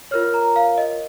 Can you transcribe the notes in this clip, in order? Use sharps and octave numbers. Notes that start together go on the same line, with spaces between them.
F4 A#4 C#5 F6
A#5
F5
D#5